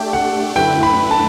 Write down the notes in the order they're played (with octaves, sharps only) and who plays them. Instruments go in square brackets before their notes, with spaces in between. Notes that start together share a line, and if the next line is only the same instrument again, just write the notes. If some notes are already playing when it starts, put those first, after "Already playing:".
Already playing: [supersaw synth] A3 D4 G4 [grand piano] G5
[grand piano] F#5
[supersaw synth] F#2 D3 A3 E4 B4 [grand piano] G5
[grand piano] B5
A5